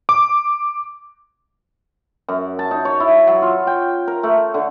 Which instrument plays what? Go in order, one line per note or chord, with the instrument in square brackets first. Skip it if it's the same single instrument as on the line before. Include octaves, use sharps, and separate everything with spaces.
[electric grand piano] D6
[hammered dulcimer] F#2
A5
D#4
C#5
E4
F#3
F4
G5
A#4
A3
D3